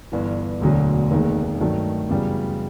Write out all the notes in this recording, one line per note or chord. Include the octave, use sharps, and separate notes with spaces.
G1 G2 E3
E1 D2 D3 F#3
F1 D#2 D#3 G#3
G2 D#3 F#3 A3
F#2 C#3 E3 G3 B3